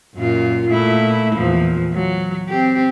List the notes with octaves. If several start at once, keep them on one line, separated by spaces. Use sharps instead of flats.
F#2 A#2 F4
A#2 A3 E4
E2 A#2 F3
F#3
C4 G4